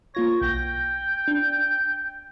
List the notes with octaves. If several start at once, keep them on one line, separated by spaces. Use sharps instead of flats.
A#3 F4 C#5 A#6
B1 G5 G6 A#6
D4